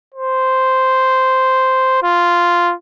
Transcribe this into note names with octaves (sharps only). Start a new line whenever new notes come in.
C5
F4